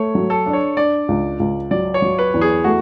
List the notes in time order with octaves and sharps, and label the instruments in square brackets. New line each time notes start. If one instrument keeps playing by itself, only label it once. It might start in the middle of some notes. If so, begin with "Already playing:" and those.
Already playing: [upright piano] A3 [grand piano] C#5
[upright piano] F#3
[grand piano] A4
[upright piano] D4
[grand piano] C#5
[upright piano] D4 [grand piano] D5
[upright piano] C#2
C#2
[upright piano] F#3 [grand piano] D5
[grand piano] C#5
[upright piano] F#3
[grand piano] B4
[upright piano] E2
[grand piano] G#4
[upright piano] A3 [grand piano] F#4